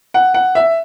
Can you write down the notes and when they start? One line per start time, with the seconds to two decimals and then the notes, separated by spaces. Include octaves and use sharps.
0.14 F#5
0.34 F#5
0.55 E5